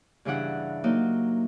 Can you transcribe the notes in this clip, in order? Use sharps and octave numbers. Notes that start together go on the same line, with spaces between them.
G2 C#3 E3 D4 F#5 F#6
F#3 A#3 D#4